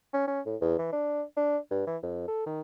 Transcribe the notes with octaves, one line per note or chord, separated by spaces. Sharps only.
C#4
C#4
A2
E2
E3
D4
D4
G2
E3
F2
A4
D#3